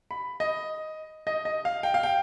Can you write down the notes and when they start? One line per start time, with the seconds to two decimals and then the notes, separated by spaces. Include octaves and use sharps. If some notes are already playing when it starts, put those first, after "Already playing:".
0.11 B5
0.40 D#5
1.27 D#5
1.45 D#5
1.65 F5
1.83 G5
1.94 F5
2.03 G5